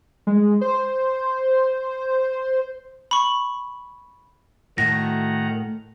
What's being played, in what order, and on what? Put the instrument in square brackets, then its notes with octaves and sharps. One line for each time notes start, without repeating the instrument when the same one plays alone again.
[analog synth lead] G#3
C5
[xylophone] B5 C#6
[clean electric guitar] A2 [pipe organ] D#3 F#5 A#5 [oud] A3 F#4 [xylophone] A#6